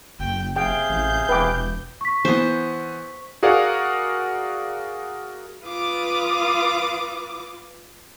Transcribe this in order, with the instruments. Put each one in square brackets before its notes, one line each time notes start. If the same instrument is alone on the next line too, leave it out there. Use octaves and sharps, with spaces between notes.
[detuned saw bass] F#1 [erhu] G5
[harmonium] C3 G#4 F5 [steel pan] G5 [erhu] G6
[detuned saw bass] A1
[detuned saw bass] E1 [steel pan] B4 G5 D6
[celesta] C#6 B6
[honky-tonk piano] E3 B3 [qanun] C5
[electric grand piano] F#4 G#4 A#4 D5 F5 F#5
[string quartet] F4 B4 D6 D#6